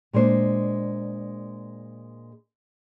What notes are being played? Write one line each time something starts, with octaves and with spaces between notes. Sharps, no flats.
A#2 G#3 D4 C5